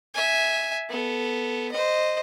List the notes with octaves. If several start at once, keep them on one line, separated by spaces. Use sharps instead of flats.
E5 G#5
B3 A4
C5 D#5